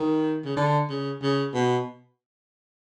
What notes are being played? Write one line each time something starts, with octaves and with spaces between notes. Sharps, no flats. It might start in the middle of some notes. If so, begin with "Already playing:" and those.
Already playing: D#3
C#3
D3
C#3
C#3
B2